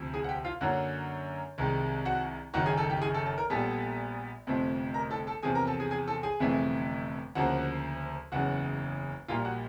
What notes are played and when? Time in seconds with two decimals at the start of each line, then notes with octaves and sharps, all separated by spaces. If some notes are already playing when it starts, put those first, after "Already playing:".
Already playing: D2 C3 F3
0.14 G#4 G#5
0.24 F#5
0.29 G4 G5
0.45 F4 F5
0.61 F#2 D3 F#3 A#3 F#4 F#5
1.58 C2 C3 D#3 G#3
2.05 F#4 F#5
2.54 F#1 F#2 D#3 F#4 F#5
2.66 G#4 G#5
2.77 A4 A5
2.90 G4 G5
3.02 G#4 G#5
3.14 A4 A5
3.26 A4 A5
3.38 A#4 A#5
3.50 A#1 A#2 G3 B3 A4 A5
4.47 G1 F2 C3 F3 A3
4.94 A#4 A#5
5.11 A4 A5
5.27 A4 A5
5.43 E2 C3 F3 G#4 G#5
5.55 A#4 A#5
5.67 A4 A5
5.80 G#4 G#5
5.91 G#4 G#5
6.08 A4 A5
6.23 G#4 G#5
6.40 G1 F2 C3 E3 A3
7.35 D2 C#3 F3 A#3 F#4 F#5
8.32 F#1 E2 C#3 F#3 F#4 F#5
9.28 A#1 A#2 G3 A#3 F4 F5
9.45 F#4 F#5